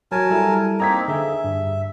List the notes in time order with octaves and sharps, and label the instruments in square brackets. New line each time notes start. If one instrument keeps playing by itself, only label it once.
[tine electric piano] F#3 F#4 [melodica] A#4 G#5 A5
[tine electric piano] G3 E4 A4
[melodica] A#3 C4 D#4 [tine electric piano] A#5 G#6 B6
[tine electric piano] D3 G#4 [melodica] E5
[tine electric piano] G2